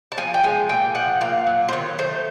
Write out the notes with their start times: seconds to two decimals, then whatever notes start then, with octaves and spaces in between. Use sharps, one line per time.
0.12 A5
0.17 F3 G#5
0.34 G5
0.43 G#3 G#5
0.69 A#2 G5
0.95 F3 F#5
1.21 A#2 F5
1.47 F#3
1.69 C5
1.73 D#3 C#5
1.99 A3 C5